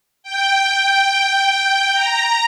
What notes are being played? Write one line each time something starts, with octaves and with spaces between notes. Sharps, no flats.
G5
A#5